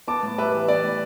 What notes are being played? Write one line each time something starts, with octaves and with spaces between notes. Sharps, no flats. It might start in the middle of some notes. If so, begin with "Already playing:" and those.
B3 A5 D6
A2
G3 B4 E5
E3
B3 D5
A2